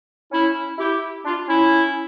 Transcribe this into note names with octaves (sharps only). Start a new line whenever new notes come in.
C#4 E4
E4 G4
D4 F4
C#4 E4